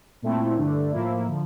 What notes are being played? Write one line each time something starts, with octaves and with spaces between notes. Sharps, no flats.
A#2 A3 C4 E4
G2 D3 A3 D4
A2 F3 A#3 E4
D3 F3